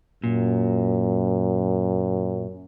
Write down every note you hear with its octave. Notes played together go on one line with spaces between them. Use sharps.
F#2 A#2